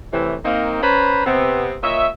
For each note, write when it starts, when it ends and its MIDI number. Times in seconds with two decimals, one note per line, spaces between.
0.12 0.35 45
0.12 0.35 48
0.12 0.35 52
0.45 0.78 58
0.45 0.78 60
0.45 0.78 63
0.82 1.24 61
0.82 1.24 71
0.82 1.24 72
0.82 1.24 82
0.82 1.24 83
1.26 1.76 48
1.26 1.76 59
1.26 1.76 60
1.83 2.08 46
1.83 2.08 73
1.83 2.08 75
1.83 2.08 76